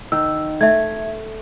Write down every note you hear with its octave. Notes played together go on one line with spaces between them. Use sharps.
D#3 E6
A3 E5 G#6